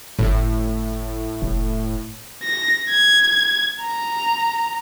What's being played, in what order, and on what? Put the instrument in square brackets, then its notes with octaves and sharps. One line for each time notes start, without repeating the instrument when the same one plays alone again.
[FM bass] G1 [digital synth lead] A2
[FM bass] F1
[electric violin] A#6
G#6
A#5